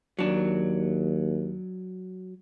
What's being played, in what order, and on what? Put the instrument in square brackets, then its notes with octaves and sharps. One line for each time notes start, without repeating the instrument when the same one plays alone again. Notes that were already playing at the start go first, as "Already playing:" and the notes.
[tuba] D#2 [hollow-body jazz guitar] F#3 D4